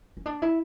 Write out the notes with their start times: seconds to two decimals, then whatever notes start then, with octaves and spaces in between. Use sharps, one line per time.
0.17 C#4
0.26 D4
0.42 E4